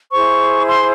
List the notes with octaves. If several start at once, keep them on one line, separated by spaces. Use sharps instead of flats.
E4 G#4 C5 C#6
C6